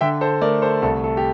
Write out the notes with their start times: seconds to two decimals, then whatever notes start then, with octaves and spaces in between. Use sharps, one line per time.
0.01 D3 E5 G5
0.21 A4 C5
0.41 A3 A#4 D5
0.62 A4 C5
0.82 C2 A4
1.04 A4
1.17 G4